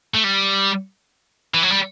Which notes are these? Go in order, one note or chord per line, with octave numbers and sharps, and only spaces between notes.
A3
G3
E3
F#3
G3